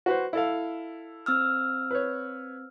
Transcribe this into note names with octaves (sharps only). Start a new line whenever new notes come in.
F#4 B4 C5
E4 A4 F5
C4 E6 F6
B4 C#5